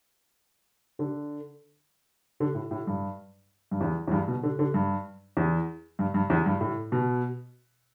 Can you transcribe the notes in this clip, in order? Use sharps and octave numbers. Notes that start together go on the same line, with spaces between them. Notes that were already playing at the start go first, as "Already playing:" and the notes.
D3
D3
A2
A2
G2
G2
E2
E2
G2
B2
D3
D3
G2
E2
G2
G2
E2
G2
A2
B2